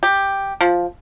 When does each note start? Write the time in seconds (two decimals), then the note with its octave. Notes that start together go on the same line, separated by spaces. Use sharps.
0.03 G4
0.61 F3